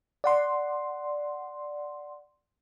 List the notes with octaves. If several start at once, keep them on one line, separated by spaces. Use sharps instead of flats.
D5 F#5 C6